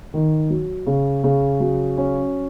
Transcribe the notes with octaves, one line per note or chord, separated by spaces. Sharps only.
D#3
F#3
C#3
C#3
F#3
C#4